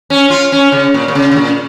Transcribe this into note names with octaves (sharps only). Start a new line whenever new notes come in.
C#4
F4
C#4
C#3
A#2
A#2
C#3
C#3
A#2